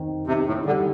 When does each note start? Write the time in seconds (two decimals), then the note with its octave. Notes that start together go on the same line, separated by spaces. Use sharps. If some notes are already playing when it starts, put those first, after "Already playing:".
Already playing: D#3 C4
0.27 C3 D#3
0.47 A2
0.66 D3 G3